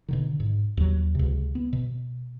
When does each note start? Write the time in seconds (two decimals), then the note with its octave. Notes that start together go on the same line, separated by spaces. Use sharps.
0.09 B2 D3 D#3
0.40 G#2
0.77 D#2 F#3
1.15 C#2 C3
1.55 B3
1.73 B2